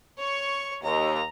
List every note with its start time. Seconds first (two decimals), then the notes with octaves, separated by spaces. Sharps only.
0.18 C#5 C#6
0.83 D#2 A#5